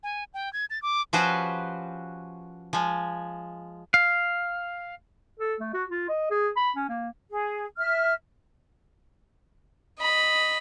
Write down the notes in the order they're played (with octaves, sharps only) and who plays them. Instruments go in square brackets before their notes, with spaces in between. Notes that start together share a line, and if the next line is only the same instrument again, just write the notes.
[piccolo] G#5
G5
G#6
A6
D6
[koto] F3 C#4 F#4 G4 B4 C5
F3 G#3
[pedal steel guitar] F5
[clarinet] A4
A3
F#4
F4
D#5
G#4
B5
C#4
A#3
[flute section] G#4
E5 F6
[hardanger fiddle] D#5 B5